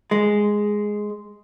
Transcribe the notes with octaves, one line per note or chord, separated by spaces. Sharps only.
G#3